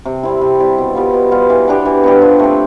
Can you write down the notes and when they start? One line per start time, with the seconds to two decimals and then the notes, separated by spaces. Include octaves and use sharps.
0.05 C3
0.23 G3 C4 E4
0.41 C3
0.59 G3 C4 E4
0.78 B2
0.95 G3 B3 F4
1.13 B2
1.31 G3 B3 F4
1.50 E3
1.68 B3 D4 G4
1.85 E3
2.04 B3 D4 G4
2.22 F3
2.39 A3 C4